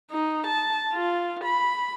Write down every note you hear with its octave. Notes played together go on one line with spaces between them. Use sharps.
D#4
A5
F4
B5